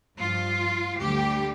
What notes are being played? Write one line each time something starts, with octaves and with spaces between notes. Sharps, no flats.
G2 F3 F4
D2 D3 G3 G4